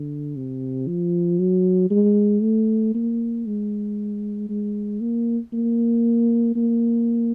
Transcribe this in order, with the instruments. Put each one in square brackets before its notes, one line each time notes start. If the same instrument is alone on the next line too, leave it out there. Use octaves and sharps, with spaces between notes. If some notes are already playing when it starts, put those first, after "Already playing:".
Already playing: [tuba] D3
C3
F3
F#3
G#3
A3
A#3
G#3
G#3
A#3
A#3
A#3